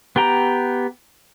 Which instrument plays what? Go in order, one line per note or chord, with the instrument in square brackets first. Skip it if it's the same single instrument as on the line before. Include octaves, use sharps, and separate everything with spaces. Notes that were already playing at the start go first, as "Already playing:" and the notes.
[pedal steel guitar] B3 G4 G5 A#5